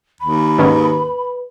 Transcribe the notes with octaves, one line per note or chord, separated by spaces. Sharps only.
D#2 B5
G#2 D#3 C#4 B4